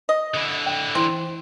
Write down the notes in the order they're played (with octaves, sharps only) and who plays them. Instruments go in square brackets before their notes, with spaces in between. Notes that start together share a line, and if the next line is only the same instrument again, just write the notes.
[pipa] D#5
[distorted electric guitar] D3 E4
[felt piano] G5
[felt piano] E3 [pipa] C4